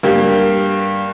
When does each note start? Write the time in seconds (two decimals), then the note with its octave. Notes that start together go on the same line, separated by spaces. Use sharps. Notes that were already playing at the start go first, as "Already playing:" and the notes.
0.03 G2 A#3 G4